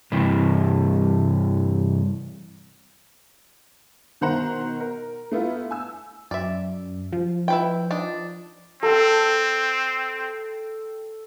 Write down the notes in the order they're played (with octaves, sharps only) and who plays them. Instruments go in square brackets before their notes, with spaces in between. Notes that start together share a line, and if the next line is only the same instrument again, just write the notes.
[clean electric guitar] G2 C3 E3
[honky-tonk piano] B2 D#3 C5 F#5 A#5
A#4
A3 B3 E4 F4
G#5 E6
[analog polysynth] F#2 [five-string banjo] D5 E5
[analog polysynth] F3
[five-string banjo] E4 B4 G5
D4 D#4
[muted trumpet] C4 [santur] A4 G5